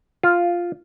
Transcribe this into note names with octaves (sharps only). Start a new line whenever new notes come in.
F4